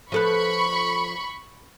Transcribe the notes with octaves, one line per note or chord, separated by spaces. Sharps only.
F3 A4 B4 B5 C#6